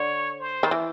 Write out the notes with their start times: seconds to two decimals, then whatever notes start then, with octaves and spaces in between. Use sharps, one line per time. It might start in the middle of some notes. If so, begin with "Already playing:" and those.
Already playing: D3 C#5
0.40 C5
0.63 D#3
0.71 E3